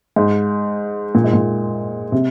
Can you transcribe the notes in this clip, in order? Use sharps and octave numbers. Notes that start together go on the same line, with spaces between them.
G#2
A#2
G#2
A#2
C3